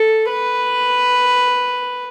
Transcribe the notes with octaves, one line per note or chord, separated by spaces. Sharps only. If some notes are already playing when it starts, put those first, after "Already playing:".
Already playing: A4
B4